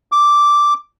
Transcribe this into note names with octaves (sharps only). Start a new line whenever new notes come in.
D6